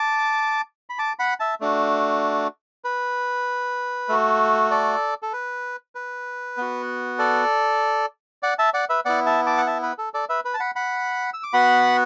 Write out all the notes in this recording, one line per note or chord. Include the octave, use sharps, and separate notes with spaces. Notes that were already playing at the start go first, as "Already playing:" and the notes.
Already playing: A5 D6
B5
A5 D6
F#5 B5
E5 A5
A3 D4 F#4
B4
A3 F#4
A4 D5
A4
B4
B4
B3 F#4
A4 D5
D5 F#5
E5 A5
D5 F#5
B4 E5
B3 E4 D5 F#5
E5 A5
A5 D6
F#5
E5 A5
B4
A4
A4 D5
B4 E5
B4
A5
F#5 B5
F#5 B5
E6
D6
B3 F#4 F#5 B5